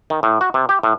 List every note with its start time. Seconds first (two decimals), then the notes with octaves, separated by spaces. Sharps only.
0.10 D#3
0.23 A2
0.41 F#4
0.54 C3
0.69 G4
0.83 A2